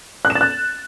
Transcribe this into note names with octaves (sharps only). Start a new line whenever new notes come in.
F#6
E7
A6
F#6